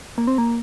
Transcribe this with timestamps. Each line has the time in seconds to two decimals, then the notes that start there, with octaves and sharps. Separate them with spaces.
0.18 A#3
0.27 C4
0.38 A#3